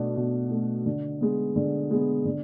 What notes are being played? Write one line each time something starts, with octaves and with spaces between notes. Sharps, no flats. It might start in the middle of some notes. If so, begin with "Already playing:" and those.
Already playing: B2 A3 D4
B2
A3 D4
D3
G#3 B3
D3
G#3 B3
D3